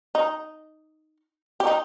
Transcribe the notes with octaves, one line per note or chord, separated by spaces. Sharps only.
D#4
G4
D#4